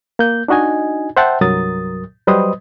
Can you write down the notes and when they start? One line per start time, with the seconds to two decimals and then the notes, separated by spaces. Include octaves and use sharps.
0.19 A#3 G6
0.48 D4 D#4 F#4 D#5 G#5
1.17 C5 E5 F#5 G5 A5
1.41 C2 G2 F#3 A#4 D#6 A6
2.27 F#3 G3 B4 C5 D#5 D#6